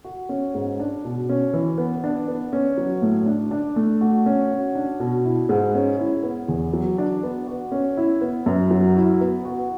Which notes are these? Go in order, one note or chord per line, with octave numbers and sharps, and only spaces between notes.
F#4
C#4
G#2
D4
B2
C#4
E3
B3
D4
B3
C#4
F#3
A2
D4
D4
A3
F#4
C#4
F#4
D4
B2
E4
G#2
C#4
E4
B3
E2
F#3
D4
B3
F#4
C#4
E4
B3
F#2
F#3
E4
B3
F#4